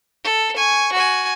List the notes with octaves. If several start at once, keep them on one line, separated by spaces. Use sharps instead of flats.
A4
G#5 C#6
F#4 G#5